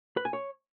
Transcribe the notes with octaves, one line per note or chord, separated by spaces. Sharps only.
B4
G#5
C#5